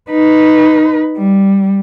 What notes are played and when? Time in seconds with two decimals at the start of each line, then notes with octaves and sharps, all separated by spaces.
0.11 D#4 B4
1.17 G3